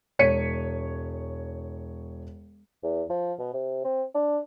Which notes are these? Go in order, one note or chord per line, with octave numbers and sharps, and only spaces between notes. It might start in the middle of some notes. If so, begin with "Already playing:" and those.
E1 C#5 B6 C#7 D#7
E2
F3
B2
C3
C4
D4